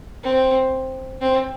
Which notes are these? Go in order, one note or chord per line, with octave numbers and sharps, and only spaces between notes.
C4
C4